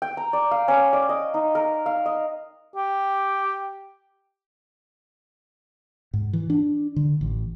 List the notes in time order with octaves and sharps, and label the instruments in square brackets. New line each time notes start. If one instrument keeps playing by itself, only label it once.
[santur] G5
A#5
D5
F5
C#4
D5
D#5
D#4
A#4
F5
D#5
[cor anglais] G4
[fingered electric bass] G#2
E3
D4
D3
A1